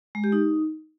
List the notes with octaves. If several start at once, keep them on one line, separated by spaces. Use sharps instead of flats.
G#3
G4
D#4